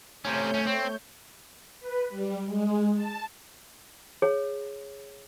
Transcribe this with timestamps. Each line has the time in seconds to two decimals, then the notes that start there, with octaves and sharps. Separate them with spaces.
0.25 C3 A3 C#4 C#5 G6
0.54 C2 C#4
0.67 C4
1.80 B4
2.10 G3
2.44 G#3
2.95 A5
4.22 G#4 C#5